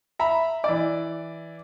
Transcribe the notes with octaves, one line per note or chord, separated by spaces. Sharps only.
E5 A#5 B5
E3 D5